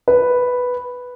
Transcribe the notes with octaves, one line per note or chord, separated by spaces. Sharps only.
B4